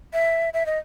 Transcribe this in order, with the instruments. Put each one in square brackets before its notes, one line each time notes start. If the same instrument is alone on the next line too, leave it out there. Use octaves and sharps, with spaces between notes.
[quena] E5
E5
D#5